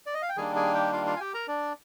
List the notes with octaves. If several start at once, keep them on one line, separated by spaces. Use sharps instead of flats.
D5
D#5
F5
G5
D#3 G3 A#3 D4 G#4 G#5
G#4 G#5
G4 G5
F4 F5
F4 F5
G#5
G4 G5
A#4 A#5
D4 D5